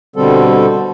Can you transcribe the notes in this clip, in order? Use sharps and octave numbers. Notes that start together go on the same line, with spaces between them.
B2 D3 G3 C4 A4